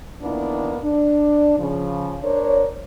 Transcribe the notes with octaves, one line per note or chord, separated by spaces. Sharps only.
F2 D#3 A#3 B3 D4 E4
D4
C#3 F3
D4 A#4 C5 C#5